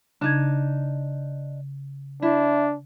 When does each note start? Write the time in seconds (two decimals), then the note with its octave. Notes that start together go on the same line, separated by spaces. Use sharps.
0.21 C#3 D4 D#4 G#6
2.22 D4 E4